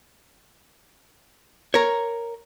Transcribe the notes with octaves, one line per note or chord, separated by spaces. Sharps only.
A#4 C#5